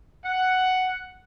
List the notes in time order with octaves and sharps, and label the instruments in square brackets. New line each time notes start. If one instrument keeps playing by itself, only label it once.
[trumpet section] F#5